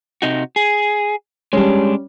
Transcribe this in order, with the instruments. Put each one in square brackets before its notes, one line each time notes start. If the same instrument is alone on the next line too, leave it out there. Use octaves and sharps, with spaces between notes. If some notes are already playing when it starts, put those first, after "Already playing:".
[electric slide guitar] C3 D#4 F#4
G#4
[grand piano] G3 C#4 [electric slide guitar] G#3 D4